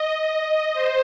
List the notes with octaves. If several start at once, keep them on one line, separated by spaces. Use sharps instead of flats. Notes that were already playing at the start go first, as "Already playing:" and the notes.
Already playing: D#5
C5